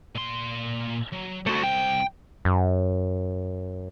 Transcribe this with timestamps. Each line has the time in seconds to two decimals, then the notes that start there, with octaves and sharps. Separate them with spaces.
0.15 A#2 C6
1.13 F#3
1.47 C2 A3 F#4 C5
1.64 G5
2.45 F#2